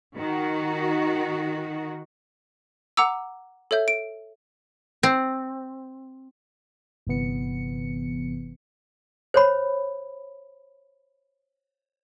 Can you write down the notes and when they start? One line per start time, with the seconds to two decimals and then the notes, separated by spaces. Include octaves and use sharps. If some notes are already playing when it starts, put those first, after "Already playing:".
0.16 D#3 F#4
2.97 F#5 A#5 D6 E6
3.71 A4 C#5 E5 G6
3.88 D7
5.03 C4
7.06 G1 C3 E3 B3 C#7
9.34 C5 C#5 B5